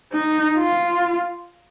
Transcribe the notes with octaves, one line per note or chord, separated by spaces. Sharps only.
D#4
F4